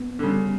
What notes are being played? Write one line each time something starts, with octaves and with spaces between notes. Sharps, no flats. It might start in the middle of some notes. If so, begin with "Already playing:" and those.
Already playing: B3
D3
C#3 G3